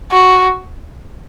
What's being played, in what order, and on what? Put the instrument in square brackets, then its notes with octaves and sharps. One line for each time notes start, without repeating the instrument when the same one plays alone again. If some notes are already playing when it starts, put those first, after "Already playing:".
[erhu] F#4